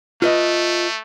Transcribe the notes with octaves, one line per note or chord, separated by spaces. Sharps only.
A3 F4 B4 D#5